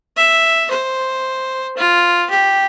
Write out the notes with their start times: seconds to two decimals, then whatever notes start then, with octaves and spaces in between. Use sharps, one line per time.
0.17 E5
0.71 C5
1.77 F4
2.30 G4